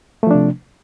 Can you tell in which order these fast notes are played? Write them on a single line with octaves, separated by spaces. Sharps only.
A3 F3 D4 C3